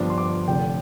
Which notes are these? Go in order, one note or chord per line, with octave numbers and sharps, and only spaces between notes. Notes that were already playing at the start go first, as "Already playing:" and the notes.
Already playing: G1 G2 F3 D4
C6
D6
F1 F2 D3 G5